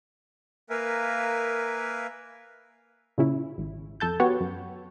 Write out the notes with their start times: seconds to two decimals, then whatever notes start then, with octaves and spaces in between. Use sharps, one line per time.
0.70 A#3 A#4 B4 E5 F5 G#5
3.18 A#2 C#3 C#4 E4
3.58 G#1
4.00 F2 A4 A5 G6
4.20 B3 F#4 G4 B4 C#5 F#5
4.40 F#2